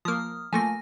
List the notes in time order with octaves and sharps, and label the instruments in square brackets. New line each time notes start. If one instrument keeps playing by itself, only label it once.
[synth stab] F3 A#3 [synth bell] D#6 F6
[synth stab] F3 A3 A#3 [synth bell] G#5 A#6